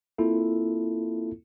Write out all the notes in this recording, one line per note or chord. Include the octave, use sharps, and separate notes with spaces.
A#3 C4 E4 F4 A4